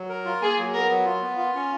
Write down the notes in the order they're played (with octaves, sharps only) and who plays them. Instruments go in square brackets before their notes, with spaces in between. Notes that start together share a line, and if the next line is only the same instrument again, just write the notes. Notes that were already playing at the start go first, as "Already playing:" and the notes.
Already playing: [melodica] F#3
A#4
F4
[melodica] A#3 [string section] G#4
[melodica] F#3
[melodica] B3 [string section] A#4
[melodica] F#3
F4
B3
F4
C#4